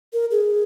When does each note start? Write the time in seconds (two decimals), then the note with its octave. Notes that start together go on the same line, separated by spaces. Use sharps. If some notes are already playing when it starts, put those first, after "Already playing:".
0.13 A#4
0.31 G#4